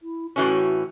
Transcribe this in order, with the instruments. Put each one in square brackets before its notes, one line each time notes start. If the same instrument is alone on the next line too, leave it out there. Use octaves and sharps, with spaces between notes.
[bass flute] E4
[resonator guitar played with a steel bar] A2 E3 C#4 [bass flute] F#4